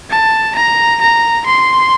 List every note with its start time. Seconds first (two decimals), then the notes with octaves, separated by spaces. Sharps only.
0.10 A5
0.56 A#5
1.02 A#5
1.47 C6